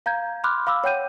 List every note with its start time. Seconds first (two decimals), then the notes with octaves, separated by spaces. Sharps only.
0.06 F5 A#5 G6 G#6
0.44 B5 C6 D6 F6 F#6
0.67 F5 B5 D6 E6
0.84 C#5 F#5 G5 G6 D#7